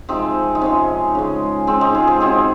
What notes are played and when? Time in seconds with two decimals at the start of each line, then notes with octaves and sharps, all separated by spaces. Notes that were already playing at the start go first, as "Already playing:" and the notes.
0.09 C3 F3 G#3 C4 D#4
0.55 D#4
0.61 C3 F3 G#3 C#4
1.15 C#3 G#3
1.67 C#3 G#3 C4
1.81 C4 D#4
1.95 F4 G#4
2.07 G#4 C5
2.20 C3 D#3 F#3 C4 D#4